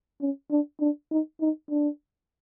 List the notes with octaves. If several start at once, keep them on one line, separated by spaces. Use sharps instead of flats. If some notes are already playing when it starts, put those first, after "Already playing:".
C#4
D4
D4
D#4
D#4
D4